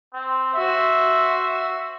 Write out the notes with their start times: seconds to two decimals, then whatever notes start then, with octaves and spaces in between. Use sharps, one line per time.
0.14 C4
0.54 F#4 C5 E5